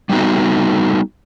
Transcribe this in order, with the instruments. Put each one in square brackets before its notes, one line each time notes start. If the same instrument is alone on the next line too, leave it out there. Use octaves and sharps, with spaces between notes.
[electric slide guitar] G3 A3 B3 D#4 F#4